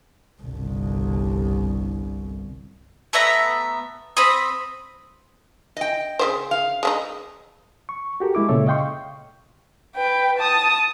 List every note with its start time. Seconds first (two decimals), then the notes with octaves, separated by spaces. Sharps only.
0.42 G1 C2
3.13 A3 B3 E5 A#5
4.17 C4 B5 D#6
5.77 D#5 G5
6.19 C#3 B3 C5
6.51 F5
6.83 G#3 D4 D#4
7.89 C#6
8.20 F#4 G4 A4 A#4
8.35 G#3 E4 D6
8.49 A#2 C#3 A4 C#5 E5
8.67 D#5 F5 G5 C6 C#6
9.96 B4 G5
10.38 A5 D#6